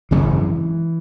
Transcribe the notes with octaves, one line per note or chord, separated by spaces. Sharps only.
G#1 F#2 C#3 E3